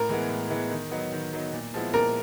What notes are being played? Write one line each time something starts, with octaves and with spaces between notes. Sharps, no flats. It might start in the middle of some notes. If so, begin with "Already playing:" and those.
Already playing: A2 A#4
E3 G#3 B3
A2
E3 G#3 B3
D#3
F#3 B3 D#4
D#3
F#3 B3 D#4
A#2
F3 G#3 B3 E4
A#2 A#4